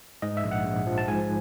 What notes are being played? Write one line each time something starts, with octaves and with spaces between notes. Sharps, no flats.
G#2 D#5
E5
A#1
F#5
A#1
F3
A5
G#2 G#5